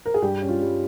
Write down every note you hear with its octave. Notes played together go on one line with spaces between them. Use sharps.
A#4
G#4
G2 G4
C#4
F4
G3